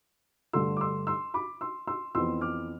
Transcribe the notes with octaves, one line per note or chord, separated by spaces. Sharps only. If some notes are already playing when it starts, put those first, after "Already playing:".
G2 D3 A3 C6 E6
D6
C6 E6
C6 E6
B5 D6
C6 E6
C6 E6
F2 E3 B3 C6 E6
D6 F6